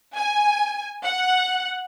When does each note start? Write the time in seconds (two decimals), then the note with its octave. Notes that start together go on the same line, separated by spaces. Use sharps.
0.15 G#5
1.03 F#5